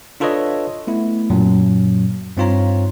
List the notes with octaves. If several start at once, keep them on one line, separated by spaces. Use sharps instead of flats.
D4 F4 A4 B4 C#5 D#5
A3 B3 E4
F#2 A#2 F#3
G2 C4 D#4 F4 C#5 A#5